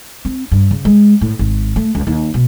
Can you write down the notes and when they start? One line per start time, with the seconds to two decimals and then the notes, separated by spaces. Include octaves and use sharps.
0.25 C4
0.52 G2
0.71 C#3
0.85 G#3
1.21 A2
1.39 G#1
1.76 A3
1.95 C#2
2.07 D#2
2.34 B2